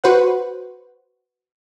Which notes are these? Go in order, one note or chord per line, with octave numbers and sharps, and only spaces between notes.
F#4 B4 C5 F#5